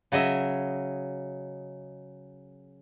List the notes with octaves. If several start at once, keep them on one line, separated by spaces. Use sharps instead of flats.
C#3 F#3 D#5 E5